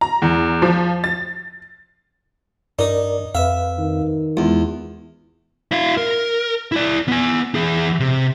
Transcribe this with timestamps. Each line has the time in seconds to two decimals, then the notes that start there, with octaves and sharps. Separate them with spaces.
0.01 A#5
0.22 E2
0.62 F3
1.04 A6
2.79 G2 D#4 A#4 D5
3.35 F2 B4 E5 F5
3.78 D#3
4.37 E2 G#3 F4
5.71 E4 F5
5.97 A#4
6.72 E4 D5
7.08 B3 G#5
7.55 E3 G#4
8.00 C3